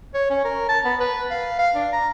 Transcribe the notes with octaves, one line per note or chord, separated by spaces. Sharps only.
C#5
C#4
A#4
A5
B3
B4
F5
F5
D4
A#5